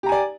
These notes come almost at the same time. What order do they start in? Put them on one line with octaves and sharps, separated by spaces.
G4 A#5 G#5 D5